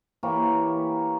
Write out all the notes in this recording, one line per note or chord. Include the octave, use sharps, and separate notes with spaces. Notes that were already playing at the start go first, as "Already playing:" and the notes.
E3 A#3 G4 C#5